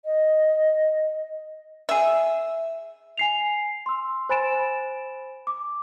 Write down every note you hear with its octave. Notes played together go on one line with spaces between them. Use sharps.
D#5
G#4 E5
G#5 C7 F7
C6 E6
C5 G#5 B5 A6 D7 E7
D6